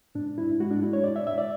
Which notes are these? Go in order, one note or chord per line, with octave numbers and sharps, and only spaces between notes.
G#2 D4
G#2 E4
G#3 F#4
D4
G#3 E4
C#5
G#2 D5
E5
G#2 E5
D5